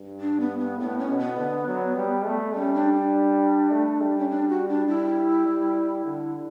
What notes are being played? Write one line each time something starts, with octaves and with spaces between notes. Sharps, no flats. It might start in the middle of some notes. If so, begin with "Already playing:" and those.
Already playing: G2
D4
B3
B3
A2 B3
C#4
B2
B3
D3
F#3
G3
A3
G3 C#4
D4
D4
A3
G3
C#4
D4
F#4
D4
G3 E4
G3
D3